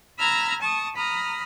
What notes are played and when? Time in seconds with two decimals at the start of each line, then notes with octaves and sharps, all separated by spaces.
0.18 A#5 B5 E6 F6 G#6
0.60 A5 C#6 D#6
0.95 A#5 B5 D#6 F6